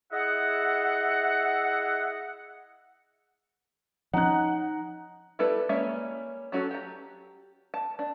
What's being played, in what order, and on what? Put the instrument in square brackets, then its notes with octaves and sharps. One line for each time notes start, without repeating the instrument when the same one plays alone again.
[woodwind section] E4 G#4 D#5 E5 F#5
[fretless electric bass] F3 C#4 [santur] D#4 [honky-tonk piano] F#5 F#6
[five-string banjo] G3 B3 E4 A4 B4
G3 G#3 A#3 C#4 E5
F#3 C#4 F#4 A4
G4 A#5
A5
D4